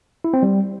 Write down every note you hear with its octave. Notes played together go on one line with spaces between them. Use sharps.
E4
C4
G3